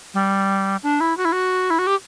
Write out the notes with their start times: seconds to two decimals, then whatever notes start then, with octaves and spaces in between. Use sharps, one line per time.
0.14 G3
0.83 D4
1.00 E4
1.17 F#4
1.25 E4
1.32 F#4
1.70 E4
1.79 F#4
1.87 G4